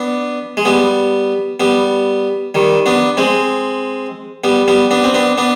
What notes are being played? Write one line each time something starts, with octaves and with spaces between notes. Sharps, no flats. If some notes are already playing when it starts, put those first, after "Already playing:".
Already playing: B3 D4
G#3
G3 B3
G3 B3
D#3 G3
B3 D4
G#3 C4
G3 B3
G3 B3
B3 D4
C4
B3 D4
B3 D4